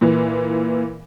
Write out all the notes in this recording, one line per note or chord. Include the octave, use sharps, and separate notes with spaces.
A#2 E3